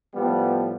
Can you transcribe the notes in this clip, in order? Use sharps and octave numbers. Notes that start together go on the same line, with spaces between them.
A2 F3 G3 B3